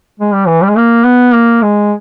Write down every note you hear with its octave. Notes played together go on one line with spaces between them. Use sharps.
G#3
G3
E3
G3
G#3
A#3
B3
A#3
G#3